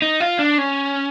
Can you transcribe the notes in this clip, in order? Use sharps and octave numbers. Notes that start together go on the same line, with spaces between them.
D#4
F4
D4
C#4